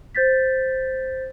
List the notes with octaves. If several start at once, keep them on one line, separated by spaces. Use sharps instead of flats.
C5 G6 A6 B6